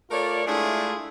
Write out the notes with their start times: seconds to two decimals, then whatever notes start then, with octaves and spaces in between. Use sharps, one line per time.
0.11 A3 F4 A#4 C#5 D5
0.46 G#3 A3 D4 E4 F4 G#4